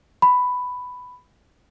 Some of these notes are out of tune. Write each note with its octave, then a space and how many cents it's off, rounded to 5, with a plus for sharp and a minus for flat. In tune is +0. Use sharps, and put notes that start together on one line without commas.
B5 +10